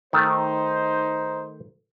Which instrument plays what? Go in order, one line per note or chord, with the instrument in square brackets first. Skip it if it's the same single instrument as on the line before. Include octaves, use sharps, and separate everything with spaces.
[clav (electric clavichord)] D#3 A3 [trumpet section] D#4 C5